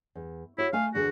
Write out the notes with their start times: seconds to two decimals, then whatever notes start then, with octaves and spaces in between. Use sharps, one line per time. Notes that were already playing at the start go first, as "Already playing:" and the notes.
0.15 E2
0.58 E4 F#4 C#5
0.73 A3 A4 F5 G#5
0.94 E2 D3 F#4 G#4